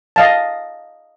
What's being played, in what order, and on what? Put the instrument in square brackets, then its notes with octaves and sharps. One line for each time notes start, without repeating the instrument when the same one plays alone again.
[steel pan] D#5 F5 A5